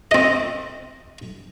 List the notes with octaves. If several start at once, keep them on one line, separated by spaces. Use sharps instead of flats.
C4 D#5